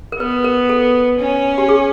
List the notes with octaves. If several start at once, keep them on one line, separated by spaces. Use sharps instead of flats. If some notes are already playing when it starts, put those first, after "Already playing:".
A#4
B3 B4
A#4
A4
C#4
G4
G#4